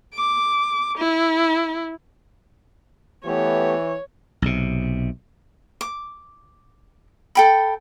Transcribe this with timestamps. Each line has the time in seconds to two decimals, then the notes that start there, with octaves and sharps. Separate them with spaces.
0.14 D6
0.98 E4
3.26 E3 A3 B3 G4 C#5
4.42 B1 C3
5.81 D6
7.35 A4 G5 B5